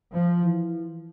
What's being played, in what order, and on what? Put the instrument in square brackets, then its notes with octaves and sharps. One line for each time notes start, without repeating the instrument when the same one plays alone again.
[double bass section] F3
[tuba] E3